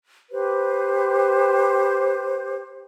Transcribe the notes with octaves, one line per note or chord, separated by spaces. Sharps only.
G4 B4 C5